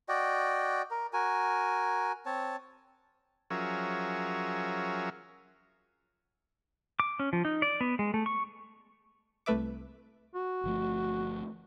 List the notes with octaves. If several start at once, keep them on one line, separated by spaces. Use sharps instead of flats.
F#4 D5 D#5 G5
A#4
F#4 A#4 G#5
C4 C#5 A5
F3 F#3 C#4 G#4 A#4 E5
D6
C#4
F3
D#4
D5
B3
G#3
A3
C#6
C2 A3 B4 E5 D6
F#4
G1 F3 A3